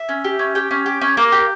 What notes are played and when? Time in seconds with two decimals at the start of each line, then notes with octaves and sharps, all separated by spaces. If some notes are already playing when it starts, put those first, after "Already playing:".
Already playing: E5
0.09 C#4
0.24 G4
0.39 C#4
0.55 G4 G5
0.71 C#4
0.86 G4
1.01 C#4
1.17 A#3
1.32 G4